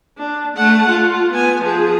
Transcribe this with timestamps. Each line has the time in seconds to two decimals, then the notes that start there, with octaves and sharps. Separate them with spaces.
0.18 D4
0.57 A3 F#5
0.88 F4
1.33 B3 G#5
1.62 F3 G#4